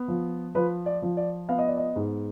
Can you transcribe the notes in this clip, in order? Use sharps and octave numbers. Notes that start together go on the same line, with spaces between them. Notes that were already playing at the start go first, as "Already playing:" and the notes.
Already playing: B3
F3
F3 B4
D5
F3
D5
B3 F5
D#5
D5
D#5
G#2